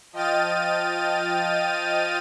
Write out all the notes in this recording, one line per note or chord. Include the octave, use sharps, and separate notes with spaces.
F3 D#5 G5 F6 A6 D#7